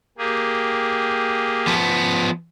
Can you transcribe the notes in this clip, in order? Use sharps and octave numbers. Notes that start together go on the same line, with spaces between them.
A#3 G4 G#4
F3 B3